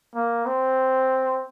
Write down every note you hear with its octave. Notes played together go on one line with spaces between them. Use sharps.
A#3
C4